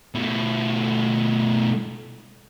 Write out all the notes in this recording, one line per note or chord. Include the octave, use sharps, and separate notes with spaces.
B2 A3